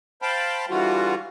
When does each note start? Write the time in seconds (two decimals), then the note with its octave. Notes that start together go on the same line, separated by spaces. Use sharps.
0.22 C5 F5 G5 A5 B5
0.70 D3 E3 G3 F4 F#4